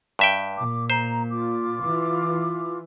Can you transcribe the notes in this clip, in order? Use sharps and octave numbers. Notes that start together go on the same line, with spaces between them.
G2 E5 G5
A#2 D6
C5 A#5
F4 D6
E3